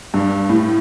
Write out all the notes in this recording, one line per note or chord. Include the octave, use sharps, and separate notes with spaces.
G2
A2